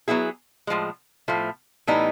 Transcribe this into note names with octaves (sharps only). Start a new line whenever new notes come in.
F#3 B3 E4 G#4
A2 F3 G#3
A2 F3 A3
A2 E3 G3 B3 D#4